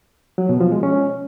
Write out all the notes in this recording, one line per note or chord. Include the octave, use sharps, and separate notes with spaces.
F#3
B2
F3
G#3
C#4